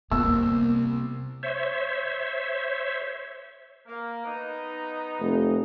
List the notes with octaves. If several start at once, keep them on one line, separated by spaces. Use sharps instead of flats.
C2 A#3 B3 E6
C5 C#5 E5
A#3
B3 D#4
F1